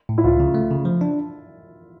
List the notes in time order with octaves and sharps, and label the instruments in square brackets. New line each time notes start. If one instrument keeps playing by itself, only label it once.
[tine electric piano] A2
[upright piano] E4
[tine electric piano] C#2 [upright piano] F4
[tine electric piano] C#3
A3
C#3
F3
D4